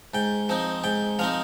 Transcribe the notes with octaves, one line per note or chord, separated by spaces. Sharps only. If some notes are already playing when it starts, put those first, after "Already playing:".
G#2 G5
F3 C4 D#4
G#2 G5
F3 C4 D#4 F5